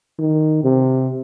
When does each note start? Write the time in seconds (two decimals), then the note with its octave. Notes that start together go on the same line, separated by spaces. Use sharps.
0.19 D#3
0.64 C3